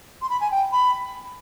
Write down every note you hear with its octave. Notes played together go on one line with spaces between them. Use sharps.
C6
B5
G#5
G5
B5